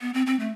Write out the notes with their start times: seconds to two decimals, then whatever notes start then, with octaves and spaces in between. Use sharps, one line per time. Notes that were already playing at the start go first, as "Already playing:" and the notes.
0.01 B3
0.14 C4
0.27 C4
0.40 A3